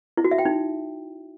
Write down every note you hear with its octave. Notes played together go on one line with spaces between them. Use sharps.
E4
F#4
E5
G5
D#4